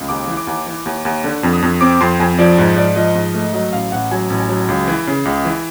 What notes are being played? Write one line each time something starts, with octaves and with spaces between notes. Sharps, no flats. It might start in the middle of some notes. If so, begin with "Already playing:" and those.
Already playing: C#2
D#2 D6
E3
D6
D#2
E3
D#2
D#2
D3
F2
D#6
F2
C4 D6
F2 C6
F2 G#5
F3 D5
G#2
G#2 D5
F3 D#5
G#2
A3
F#3 D#5
A1 F5
A1 F#5
F#3 G#5
A1
G#5
F#3
C#2
E3
C#3
C#2
E3